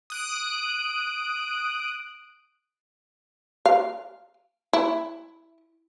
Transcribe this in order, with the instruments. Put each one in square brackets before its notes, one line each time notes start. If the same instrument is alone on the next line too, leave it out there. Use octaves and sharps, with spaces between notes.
[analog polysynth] D#6 F#6 D7
[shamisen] F5
E4